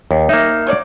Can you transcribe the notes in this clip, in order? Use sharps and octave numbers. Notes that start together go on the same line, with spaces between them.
D#2
A#3 D#4 E5
F#3 C#5 D5